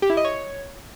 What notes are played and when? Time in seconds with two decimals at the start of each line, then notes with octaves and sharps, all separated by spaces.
0.02 G4
0.10 E4
0.17 D#5
0.25 C#5